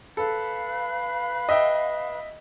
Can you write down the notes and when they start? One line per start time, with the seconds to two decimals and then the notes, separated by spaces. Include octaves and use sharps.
0.17 A4 B4 F5 B5
1.49 D#5 E5 G5